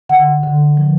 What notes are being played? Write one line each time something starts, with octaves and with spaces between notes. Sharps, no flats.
D3 F#5
D3
F3